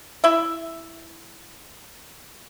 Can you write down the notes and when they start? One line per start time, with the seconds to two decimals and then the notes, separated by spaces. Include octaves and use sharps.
0.24 E4 E5